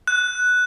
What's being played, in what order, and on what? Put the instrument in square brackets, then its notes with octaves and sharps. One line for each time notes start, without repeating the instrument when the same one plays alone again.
[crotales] F#6